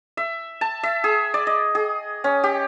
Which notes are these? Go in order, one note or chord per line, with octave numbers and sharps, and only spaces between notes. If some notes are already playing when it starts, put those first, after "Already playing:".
E5
A5
E5
G#4
D5
D#5
G#4
C#4
G4